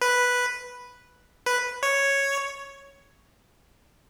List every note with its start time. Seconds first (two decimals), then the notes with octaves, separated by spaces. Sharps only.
0.02 B4
1.46 B4
1.83 C#5